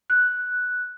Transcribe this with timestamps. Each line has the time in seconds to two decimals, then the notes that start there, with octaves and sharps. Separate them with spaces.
0.10 F#6